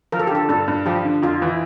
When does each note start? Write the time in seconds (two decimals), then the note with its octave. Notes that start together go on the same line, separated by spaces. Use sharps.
0.12 F3 A#4
0.19 A4
0.27 G4
0.31 D3 A4
0.49 G2 A4
0.68 G2
0.86 F3 G4
1.04 D3
1.22 F2 F4
1.42 E3